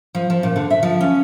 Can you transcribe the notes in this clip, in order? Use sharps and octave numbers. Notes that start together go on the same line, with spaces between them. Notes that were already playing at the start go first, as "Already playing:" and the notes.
F3
F3
A#2
D3
E5
F3
C#4